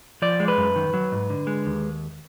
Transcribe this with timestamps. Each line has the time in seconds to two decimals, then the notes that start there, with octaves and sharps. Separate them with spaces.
0.22 F3 D5
0.40 G#3
0.48 B4
0.57 F#2
0.76 D#3
0.94 F#3
1.12 G#2
1.30 D3
1.47 G#3
1.66 D#2